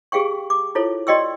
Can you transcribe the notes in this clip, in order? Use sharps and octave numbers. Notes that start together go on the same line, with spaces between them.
G4 G#4 F5 G5 C#6
D6
E4 F4 A4 C#5
F#4 D5 D#5 G5 C#6 E6